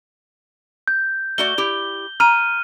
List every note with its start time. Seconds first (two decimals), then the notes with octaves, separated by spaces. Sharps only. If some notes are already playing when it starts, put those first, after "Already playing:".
0.88 G6
1.38 A3 F#4 D5 G7
1.58 E4 G4
2.20 A#5 F6 D#7